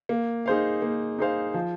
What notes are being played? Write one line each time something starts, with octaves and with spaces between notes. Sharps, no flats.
A#3
D#4 G#4 C5 F5
A#3
D#4 G#4 C5 F5
F3